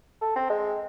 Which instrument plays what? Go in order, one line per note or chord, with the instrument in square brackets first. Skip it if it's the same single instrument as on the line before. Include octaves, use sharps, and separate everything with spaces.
[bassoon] A4
C4
G#3